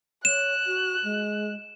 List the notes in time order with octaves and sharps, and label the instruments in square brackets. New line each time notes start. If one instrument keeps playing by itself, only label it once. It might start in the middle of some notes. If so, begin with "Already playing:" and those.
[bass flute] C#5 [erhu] F#6 [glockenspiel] E7
[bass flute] F#4
G#3